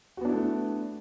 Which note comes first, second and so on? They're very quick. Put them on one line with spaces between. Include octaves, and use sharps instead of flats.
F#4 B3 D4 E4 A3